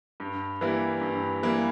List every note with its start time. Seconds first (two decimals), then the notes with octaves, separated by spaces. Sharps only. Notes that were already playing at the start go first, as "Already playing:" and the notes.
0.20 G2
0.61 E3 G3 A#3 E4
1.01 G2
1.43 E3 G3 A#3 E4